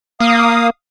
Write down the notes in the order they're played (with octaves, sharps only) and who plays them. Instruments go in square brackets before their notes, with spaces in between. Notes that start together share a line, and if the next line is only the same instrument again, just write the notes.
[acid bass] A#3 [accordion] F5 D#6